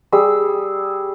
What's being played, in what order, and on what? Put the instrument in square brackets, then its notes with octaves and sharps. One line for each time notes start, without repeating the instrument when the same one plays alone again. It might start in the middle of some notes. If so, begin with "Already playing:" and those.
[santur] G3 G#4 E6